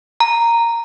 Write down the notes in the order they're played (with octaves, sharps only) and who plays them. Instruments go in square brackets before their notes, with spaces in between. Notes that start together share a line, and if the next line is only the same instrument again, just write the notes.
[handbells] A#5